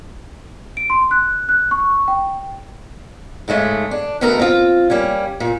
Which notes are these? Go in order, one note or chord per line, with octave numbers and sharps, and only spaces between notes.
D7
C6
F#6
F#6
C#6
G5
G#2 C#3 G#3 A3
D4
D2 B2 B3 A4 A#4 A#5
C4 F4
G3 A#3 C#4
A#2